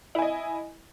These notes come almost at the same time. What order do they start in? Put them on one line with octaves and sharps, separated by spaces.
E4 G#5 D#5